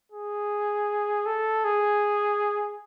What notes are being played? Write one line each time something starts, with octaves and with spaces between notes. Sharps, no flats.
G#4
A4
G#4